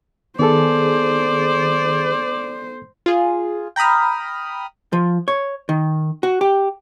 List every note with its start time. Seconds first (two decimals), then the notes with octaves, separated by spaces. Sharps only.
0.39 D#3 B3 G#4 A4 C5 D5
3.06 F4 G#4
3.76 G5 A#5 B5 D#6 F6
4.93 F3
5.28 C#5
5.69 D#3
6.23 F#4
6.41 G4